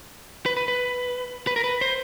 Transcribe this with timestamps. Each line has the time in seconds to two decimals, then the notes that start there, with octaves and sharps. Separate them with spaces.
0.46 B4
0.57 B4
0.68 B4
1.47 B4
1.56 A#4
1.64 B4
1.81 C5